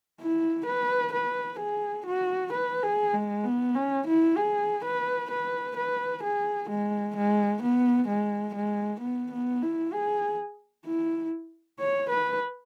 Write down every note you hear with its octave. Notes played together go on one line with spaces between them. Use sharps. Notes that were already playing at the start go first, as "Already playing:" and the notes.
E4
B4
B4
G#4
F#4
B4
G#4
G#3
B3
C#4
E4
G#4
B4
B4
B4
G#4
G#3
G#3
B3
G#3
G#3
B3
B3
E4
G#4
E4
C#5
B4